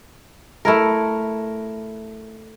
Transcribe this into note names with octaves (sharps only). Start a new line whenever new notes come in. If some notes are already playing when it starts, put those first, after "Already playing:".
A3 E4 A#4